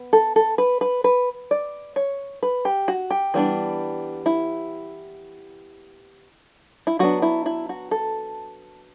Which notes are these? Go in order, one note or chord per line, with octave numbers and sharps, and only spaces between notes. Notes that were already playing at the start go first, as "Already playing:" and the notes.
Already playing: B3
A4
A4
B4
B4
B4
D5
C#5
B4
G4
F#4
G4
E3 G3 B3 D4
E4
E4
F#3 B3 D4 F#4
E4
E4
F#4
A4